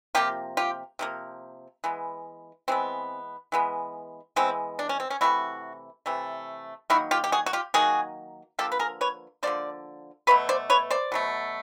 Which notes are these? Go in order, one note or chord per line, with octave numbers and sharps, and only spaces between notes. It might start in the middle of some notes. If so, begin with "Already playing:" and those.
C3 F3 A#3 F4 G4
F4 G4
C3 F3 A#3
E3 G#3 B3
E3 G#3 B3 C4
E3 G#3 B3
E3 G#3 B3 C4
D4
C#4
C4
C#4
C3 E3 A3 E4 F#4
C3 E3 A3
D#3 F#3 A#3 E4 F#4
F4 G4
G4
F#4 G#4
F#4
F4 G4
D#3 F#3 A#3 F#4 G#4
D3 F3 A#3 G4 A4
B4
G#4 A#4
B4 C#5
D3 F3 A#3 C5 D5
B2 F#3 A3 B4 C#5
C5 D5
B4 C#5
C5 D5
B2 F#3 A3